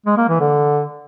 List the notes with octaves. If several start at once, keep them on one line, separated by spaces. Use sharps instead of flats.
G#3
A#3
E3
D3